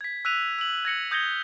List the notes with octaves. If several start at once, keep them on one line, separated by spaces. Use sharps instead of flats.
G#6 B6
E6 F#6 B6 D#7 F7
E6 F#7
G#6 A#6 C#7 F#7
D#6 G6 G#6 A#6 C#7 G7